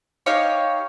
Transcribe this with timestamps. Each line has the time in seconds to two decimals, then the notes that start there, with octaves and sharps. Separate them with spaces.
0.26 D#4 G4 C#5 F5